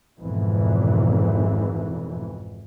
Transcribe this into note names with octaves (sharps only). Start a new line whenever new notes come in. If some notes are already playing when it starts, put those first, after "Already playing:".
G#1 F2 B2 E3